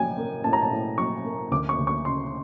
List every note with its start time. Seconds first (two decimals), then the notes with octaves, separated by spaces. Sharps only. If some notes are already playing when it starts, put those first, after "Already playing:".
Already playing: A2 F#3 G5 G#5
0.18 A#3
0.44 A2 A5
0.53 A#5
0.62 A5
0.71 A2
0.98 F#3 C#6
1.24 A#3
1.51 D2 D6
1.69 C#6
1.78 D2
1.87 C#6
2.05 C#3 C6